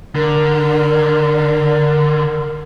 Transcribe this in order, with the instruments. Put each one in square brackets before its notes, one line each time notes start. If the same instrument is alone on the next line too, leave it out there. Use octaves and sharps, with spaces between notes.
[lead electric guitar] D3 [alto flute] A#4